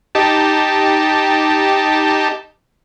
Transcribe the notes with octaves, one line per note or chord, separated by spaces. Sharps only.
D#4 G4 A5